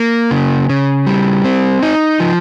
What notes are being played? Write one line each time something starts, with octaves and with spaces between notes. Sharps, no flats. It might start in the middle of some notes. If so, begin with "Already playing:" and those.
Already playing: A#3
C#3
C#3
G3
C4
D#4
F3